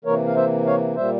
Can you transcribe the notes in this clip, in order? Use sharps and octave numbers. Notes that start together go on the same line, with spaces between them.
C3 E3 A#3 A#4 C#5
F5
C5 E5
C#5 F5
A#2 G3 A#3 C5 E5